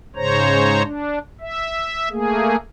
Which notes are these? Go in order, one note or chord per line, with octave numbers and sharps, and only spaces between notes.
G#2 C#3 C5 C#5 A#5
D4
E5
A3 A#3 G#4